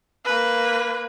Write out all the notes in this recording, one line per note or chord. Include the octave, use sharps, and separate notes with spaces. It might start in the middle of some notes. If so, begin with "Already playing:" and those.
A#3 B4